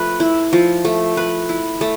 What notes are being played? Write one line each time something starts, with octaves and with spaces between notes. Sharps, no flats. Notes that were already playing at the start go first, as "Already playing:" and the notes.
Already playing: F3 A3 B4
E4
F3
A3
B4
E4
A3